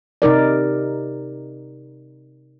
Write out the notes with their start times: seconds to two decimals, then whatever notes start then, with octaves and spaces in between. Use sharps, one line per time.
0.22 C3 D#4 A#4 D5